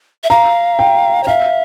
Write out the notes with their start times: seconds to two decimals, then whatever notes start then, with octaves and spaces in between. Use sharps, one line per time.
0.24 E5
0.30 F5 A#5
0.79 G5
1.23 C#5
1.27 E5 F5